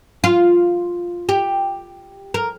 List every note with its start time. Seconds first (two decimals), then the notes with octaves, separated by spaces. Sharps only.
0.24 F4
1.29 G4
2.34 A#4